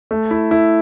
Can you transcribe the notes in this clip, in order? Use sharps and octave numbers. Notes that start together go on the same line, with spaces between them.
A3
E4
E4